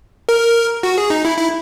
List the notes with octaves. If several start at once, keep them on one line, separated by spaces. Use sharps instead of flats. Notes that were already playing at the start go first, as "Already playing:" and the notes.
A#4
F#4
G#4
D#4
E4
E4